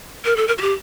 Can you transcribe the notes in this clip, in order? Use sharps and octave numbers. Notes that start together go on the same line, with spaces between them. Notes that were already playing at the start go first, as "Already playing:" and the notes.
A#4
A4
A#4
F#4
G4